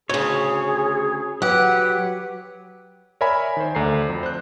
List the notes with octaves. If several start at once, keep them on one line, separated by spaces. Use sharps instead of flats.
D2 C#3 G#4 C#5
F#3 G4 B4 F#5
A#4 C#5 D5 E5 G#5 B5
D#3 C5
D2 A4 D5 A#5 C7
F2
C5 F#6